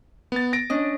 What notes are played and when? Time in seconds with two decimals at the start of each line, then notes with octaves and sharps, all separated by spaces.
0.32 B3 A6
0.53 A#6 D7
0.70 C#4 D4 D#5